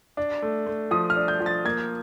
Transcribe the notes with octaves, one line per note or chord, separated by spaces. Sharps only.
D4
A3
A3
F3 D#6
F6
D4
G6
F3
A6
A#3 G#6